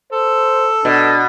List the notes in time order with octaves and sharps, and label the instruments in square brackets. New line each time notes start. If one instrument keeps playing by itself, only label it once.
[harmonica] A4 [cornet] C5
[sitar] B2 [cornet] D4